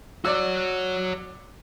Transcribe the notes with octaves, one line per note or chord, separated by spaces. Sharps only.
F#4 C#5 D5 E6